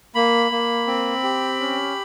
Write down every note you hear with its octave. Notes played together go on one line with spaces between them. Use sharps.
A#3 B5
A#3
C4
G4
C#4